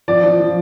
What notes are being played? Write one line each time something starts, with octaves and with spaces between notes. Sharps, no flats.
F3 D5
F3
F3